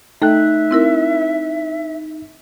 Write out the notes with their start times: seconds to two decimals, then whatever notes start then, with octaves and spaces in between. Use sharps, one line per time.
0.22 A3 D#4 A4 E5 G5 F#6
0.71 C4 E4 A#4